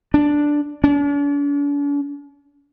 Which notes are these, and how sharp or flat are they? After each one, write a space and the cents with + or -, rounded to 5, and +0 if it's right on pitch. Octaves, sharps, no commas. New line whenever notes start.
D4 +0
D4 -45